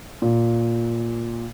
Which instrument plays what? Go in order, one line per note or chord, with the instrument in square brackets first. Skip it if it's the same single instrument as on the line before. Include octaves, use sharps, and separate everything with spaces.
[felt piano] A#2